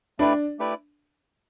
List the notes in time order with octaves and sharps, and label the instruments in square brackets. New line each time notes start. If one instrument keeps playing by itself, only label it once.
[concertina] A3 E4 G4 B4 D5 [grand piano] D4
[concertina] A3 E4 G4 B4 D5